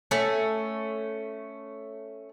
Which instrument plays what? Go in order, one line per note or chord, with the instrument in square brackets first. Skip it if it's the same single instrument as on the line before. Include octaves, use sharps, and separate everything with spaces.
[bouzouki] A3 C#4